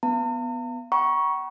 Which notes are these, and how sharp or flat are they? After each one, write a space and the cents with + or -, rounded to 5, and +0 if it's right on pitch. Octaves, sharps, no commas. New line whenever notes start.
B3 +0 A#5 -45
F#5 +45 A#5 +45 C#6 +0